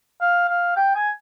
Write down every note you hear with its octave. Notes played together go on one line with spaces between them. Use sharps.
F5
F5
G5
G#5